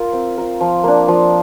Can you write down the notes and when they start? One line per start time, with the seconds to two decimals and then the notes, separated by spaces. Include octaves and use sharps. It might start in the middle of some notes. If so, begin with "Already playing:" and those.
Already playing: F4 A#4
0.13 C4
0.38 F4 A#4
0.61 F3
0.84 A#3 D4
1.08 F3